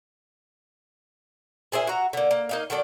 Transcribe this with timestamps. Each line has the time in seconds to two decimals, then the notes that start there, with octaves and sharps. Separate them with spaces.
1.72 A#2 G#4 C5 E5
1.87 F#4 A#5
2.13 D3 A#3
2.31 A#3
2.49 A#3 D#4 F5
2.70 D#3 F#3 A4 D5